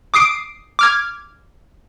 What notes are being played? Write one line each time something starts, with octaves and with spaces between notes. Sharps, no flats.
D6 D#6 C7 D7
D6 F6 G#6